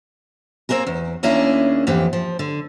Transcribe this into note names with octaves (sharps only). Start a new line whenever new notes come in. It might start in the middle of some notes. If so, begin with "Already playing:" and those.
A#3 C4 D4 G#4 A#4
E2
D#2 A#3 C#4 D4 E4 G#4
F2 G#2 E3 G4
F3
D3